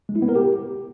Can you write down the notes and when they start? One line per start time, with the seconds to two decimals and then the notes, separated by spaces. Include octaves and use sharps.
0.09 G#3
0.16 E4
0.22 B3
0.29 A#4
0.35 G4